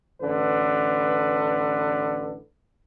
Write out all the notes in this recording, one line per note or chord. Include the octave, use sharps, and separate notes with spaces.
A1 D3 B4